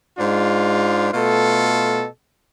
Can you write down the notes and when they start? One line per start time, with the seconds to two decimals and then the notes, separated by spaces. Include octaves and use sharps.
0.17 G#2 G#3 D4 F4
1.11 B2 A3 F4 A4